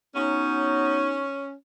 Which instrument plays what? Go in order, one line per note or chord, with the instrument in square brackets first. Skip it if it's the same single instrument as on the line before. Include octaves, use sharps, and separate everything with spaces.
[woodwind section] F#3 B3 D#4 [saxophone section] C#4